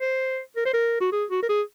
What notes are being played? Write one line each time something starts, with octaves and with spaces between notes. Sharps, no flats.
C5
A#4
C5
A#4
F#4
G#4
F#4
A#4
G#4